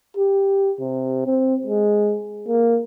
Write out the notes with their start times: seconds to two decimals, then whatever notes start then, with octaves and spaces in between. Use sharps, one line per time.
0.17 G4
0.81 C3
1.26 C4
1.66 G#3
2.48 A#3